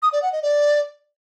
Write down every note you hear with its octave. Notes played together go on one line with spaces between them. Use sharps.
D#6
D5
F#5
D#5
D5